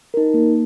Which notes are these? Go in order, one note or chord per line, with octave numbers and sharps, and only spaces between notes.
D#4 A#4
A#3